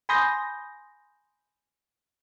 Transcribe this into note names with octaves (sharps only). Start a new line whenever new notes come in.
G#5 B5 C6 D#6 G6 A#6